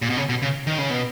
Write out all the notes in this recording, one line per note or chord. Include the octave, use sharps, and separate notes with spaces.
A#2
B2
C#3
B2
C#3
D#3
C#3
B2